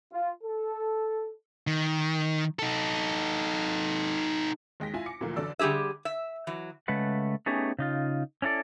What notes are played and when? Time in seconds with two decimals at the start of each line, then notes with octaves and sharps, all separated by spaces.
0.12 F4
0.43 A4
1.67 D#3
2.59 D#4 A4
4.80 D#2 G#3 G5 A#6 B6
4.94 E4 F4 G#5
5.06 D6 C#7
5.21 D2 A#2 E3 F3 A3 A#3
5.36 G1 F#2 D3 A4 D5 E6
5.59 D3 G3 G4 G#4 E5
6.05 E5
6.47 E3 F#3
6.88 C#3 G#3 A3 B4 F#5
7.46 A3 B3 C#4 D#4 G4 G#4
7.79 C#3 D#4 F4
8.42 C#4 D4 E4 A4 D5